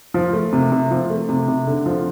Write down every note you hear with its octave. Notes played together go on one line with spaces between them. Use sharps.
F3
A3
C3
C3
F3
A3
C3
C3
D3
F3